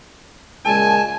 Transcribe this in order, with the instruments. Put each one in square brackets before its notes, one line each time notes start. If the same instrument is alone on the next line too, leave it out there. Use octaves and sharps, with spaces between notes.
[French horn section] A#2 C#3 G#3 [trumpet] G#5 [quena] A5